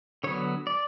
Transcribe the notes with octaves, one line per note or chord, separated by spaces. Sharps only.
D3 F#3 B3 C#5
D5